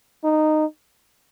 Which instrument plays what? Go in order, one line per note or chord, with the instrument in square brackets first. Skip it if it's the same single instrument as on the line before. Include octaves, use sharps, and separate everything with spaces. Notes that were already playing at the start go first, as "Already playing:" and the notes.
[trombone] D#4